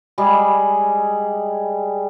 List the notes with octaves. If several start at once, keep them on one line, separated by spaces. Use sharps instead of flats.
G3 G#3 G#4